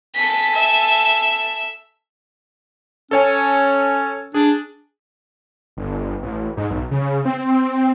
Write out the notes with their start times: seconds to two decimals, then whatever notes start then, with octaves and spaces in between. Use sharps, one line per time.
0.15 A4 G#5 B6
0.55 E5
3.11 C#4 A4 C#5 G#5
4.34 D4 G#4
5.77 G1
6.23 A1
6.57 G#2
6.71 B1
6.91 C#3
7.25 C4